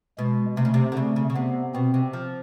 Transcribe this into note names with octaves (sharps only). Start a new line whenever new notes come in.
B2 G#3
C3 A3
C#3
C3
D3
C#3 A3
C#3
C#3
C3 B3
B2 C4
C3
F3